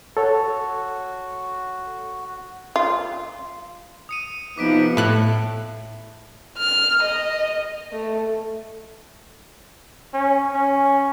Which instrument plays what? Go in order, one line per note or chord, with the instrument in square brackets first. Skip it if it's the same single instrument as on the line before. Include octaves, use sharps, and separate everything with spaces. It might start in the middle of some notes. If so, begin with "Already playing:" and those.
[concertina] F#4 [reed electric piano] A4 C#5
[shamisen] F4
[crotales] D#6 C#7 D#7
[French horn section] C3 D#4 [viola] F3 B3 [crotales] D6 B6 D7
[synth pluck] A2 F#6
[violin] F6
D#5
A3
[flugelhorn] C#4
C#4